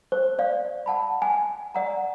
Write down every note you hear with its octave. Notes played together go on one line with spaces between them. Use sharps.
C5
D5 F5
F#5 A5 B5
G#5
D5 F#5 A#5